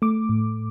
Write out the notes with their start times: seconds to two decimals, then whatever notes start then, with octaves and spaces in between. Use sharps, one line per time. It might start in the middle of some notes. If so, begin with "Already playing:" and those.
0.02 A3 D6
0.29 A2